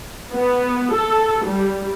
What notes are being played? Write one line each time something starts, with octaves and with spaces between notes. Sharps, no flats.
B3
A4
G3